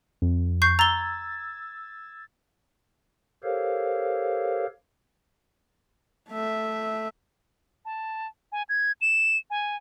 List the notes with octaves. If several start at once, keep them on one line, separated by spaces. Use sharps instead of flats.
F2
C#6 G6 C7
A#5 E6 G#6 A6 G7
G4 A4 A#4 C5 C#5 F5
A3 E5
A5
G#5
G#6
E7
G#5